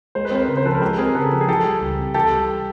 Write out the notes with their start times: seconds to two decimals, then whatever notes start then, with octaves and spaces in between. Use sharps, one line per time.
0.15 G#3 C5
0.25 B4
0.31 C4 A#4 C5
0.48 C#3 B4
0.57 C5
0.65 F3 A4 B4
0.75 A#4
0.82 G#3 G4 A4
0.98 C4 G#4 A#4
1.15 C#3 A4 B4
1.32 F3 A4
1.41 G#4
1.48 E3 G4 A4
1.65 G3
1.82 C#2
1.98 C3
2.14 E3 G4 A4
2.32 G3